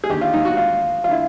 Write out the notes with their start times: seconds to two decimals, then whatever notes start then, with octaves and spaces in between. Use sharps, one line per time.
0.04 G#4
0.10 D#2 D3 G4
0.21 F4
0.33 D#4
0.45 F#4
0.57 F4
1.04 F4
1.08 D3 E4